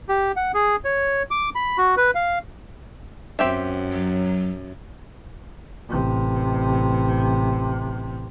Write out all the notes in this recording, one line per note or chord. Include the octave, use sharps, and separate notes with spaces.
G4
F#5
G#4
C#5
D6
B5
F#4
B4
F5
F#2 C4 G4 E5
F#3
A1 C3